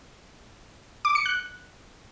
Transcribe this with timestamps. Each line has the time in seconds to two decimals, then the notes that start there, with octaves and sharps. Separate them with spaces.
1.05 D6
1.15 C#7
1.26 F#6